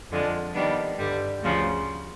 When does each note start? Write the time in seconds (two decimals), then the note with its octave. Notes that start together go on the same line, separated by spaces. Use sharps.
0.10 F2 D3 F3 G#3
0.53 D#3 G3 B3 D4
0.98 G2 D3 G3
1.42 D2 C#3 F3